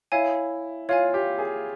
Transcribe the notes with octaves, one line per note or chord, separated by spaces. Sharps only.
E4 C#5 F5 G#5
F4 C#5 F5 G#5
G4
G#4